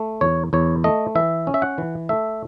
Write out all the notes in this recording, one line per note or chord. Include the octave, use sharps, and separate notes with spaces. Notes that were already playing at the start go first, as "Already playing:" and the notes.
Already playing: A3
E2 C#5
E2 C#5
A3 D#5
E3 E5
C#4
E5
F#5
E3
A3 E5